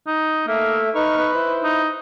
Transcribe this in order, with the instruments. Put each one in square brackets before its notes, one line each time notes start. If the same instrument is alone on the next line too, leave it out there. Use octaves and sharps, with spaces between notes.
[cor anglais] D#4
[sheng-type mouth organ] A3 E5 [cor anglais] A#3
[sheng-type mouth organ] D#4 C#6 F6 [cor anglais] B4
[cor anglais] B4
[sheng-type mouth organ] E4 C5
[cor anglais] D#4